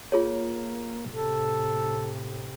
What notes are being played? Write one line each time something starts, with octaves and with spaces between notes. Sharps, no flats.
A#3 F4 G#4 C#5
A2 C3 A4